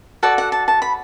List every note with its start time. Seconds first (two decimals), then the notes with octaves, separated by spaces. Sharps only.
0.23 F#4 A4 D5 A5
0.38 F#5
0.52 A5
0.68 A5
0.82 B5